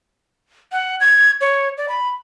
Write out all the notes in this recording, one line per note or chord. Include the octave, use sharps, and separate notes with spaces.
F#5
G#6
C#5
D5
B5